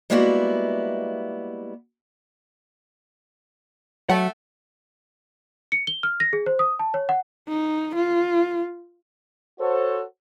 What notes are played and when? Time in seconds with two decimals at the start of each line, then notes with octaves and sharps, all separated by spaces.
0.10 G3 G#3 A#3 B3 E4 F#4
4.10 F#3 A3 F#5
5.72 C#7
5.87 G7
6.03 F6
6.20 A#6
6.33 G#4
6.46 C5
6.59 D#6
6.79 A5
6.94 C#5
7.09 F#5
7.49 D#4
7.96 F4
9.59 F#4 A4 C5 C#5